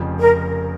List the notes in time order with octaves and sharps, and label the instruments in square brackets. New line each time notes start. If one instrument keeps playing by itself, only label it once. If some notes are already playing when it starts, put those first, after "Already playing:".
Already playing: [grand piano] F1 F2 C#3 F3
[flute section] A#4